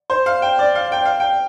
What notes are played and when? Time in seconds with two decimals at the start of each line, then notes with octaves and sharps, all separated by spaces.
0.10 C5
0.26 F5
0.42 G5
0.59 D5
0.75 F5
0.92 G5
1.05 F5
1.20 G5